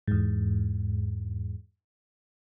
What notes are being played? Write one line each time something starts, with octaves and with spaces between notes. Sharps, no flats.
E2 G#2